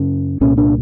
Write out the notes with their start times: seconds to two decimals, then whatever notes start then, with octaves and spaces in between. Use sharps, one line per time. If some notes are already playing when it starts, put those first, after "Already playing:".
Already playing: F#2 C#3 C#4
0.41 C2 A#2 C#4
0.58 D4